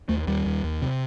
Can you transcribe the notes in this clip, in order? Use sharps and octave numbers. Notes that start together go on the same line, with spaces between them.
D#2 A3
D#2 G3
D#2
D#2
C3